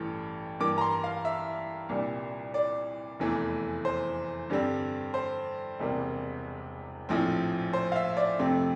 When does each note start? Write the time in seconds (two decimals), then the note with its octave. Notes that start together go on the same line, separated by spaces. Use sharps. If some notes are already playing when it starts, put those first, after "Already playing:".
Already playing: A1 G2 E3 A3
0.60 G2 E3 A#3 D6
0.78 A#5
0.81 C6
1.04 F5
1.25 E5
1.89 C2 A#2 G3 D4
2.54 D5
3.19 F1 E2 E3 A3
3.85 C5
4.50 G2 D3 G3 C4
5.14 C5
5.80 E1 E2 C3 G3 A#3
7.09 A#1 A2 F3 C4
7.73 C5
7.92 F5
7.96 E5
8.17 D5
8.39 F2 C3 F3 A3 C4